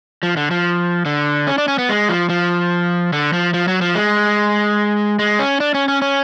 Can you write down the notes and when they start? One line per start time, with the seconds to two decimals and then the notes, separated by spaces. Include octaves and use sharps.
0.23 F3
0.37 D3
0.51 F3
1.05 D3
1.47 C#4
1.58 D4
1.68 C#4
1.78 B3
1.89 G#3
2.09 F3
2.29 F3
3.13 D3
3.33 F3
3.54 F3
3.68 F#3
3.81 F3
3.95 G#3
5.19 G#3
5.39 C#4
5.60 D4
5.74 C#4
5.88 C#4
6.02 C#4